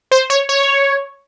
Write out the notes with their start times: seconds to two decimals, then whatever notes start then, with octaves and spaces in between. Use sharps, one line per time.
0.11 C5
0.30 C#5
0.49 C#5